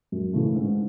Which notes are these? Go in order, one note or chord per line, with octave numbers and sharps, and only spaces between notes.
F#2
C#3 E3 A3
G#2